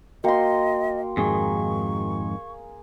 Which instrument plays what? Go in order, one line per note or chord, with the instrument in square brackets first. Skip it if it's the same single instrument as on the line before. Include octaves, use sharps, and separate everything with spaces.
[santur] A#3 C6 [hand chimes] F#4 G5 [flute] D#5
[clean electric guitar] F2 G#2 D#3 [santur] G#4 [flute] C#6